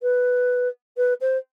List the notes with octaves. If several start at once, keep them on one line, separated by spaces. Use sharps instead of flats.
B4
B4
C5